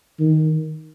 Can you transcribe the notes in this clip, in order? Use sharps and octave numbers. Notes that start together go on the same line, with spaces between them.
D#3